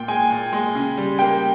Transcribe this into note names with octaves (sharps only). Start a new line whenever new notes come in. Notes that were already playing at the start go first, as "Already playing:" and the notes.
Already playing: A#2 G5
G#3 G#5
A#2
G#3
C#3
G3
A#3 G5